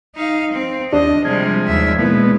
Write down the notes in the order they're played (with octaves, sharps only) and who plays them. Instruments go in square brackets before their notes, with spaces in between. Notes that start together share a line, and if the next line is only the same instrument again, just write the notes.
[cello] D#4 F5
C4
[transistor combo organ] D#2 [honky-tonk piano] D4 [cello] D#5
[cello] C3 G3 [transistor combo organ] F3 G#3 G#4
[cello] D#2 E5
[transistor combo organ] B2 B3 [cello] G#3 [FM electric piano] A#3 E4 B4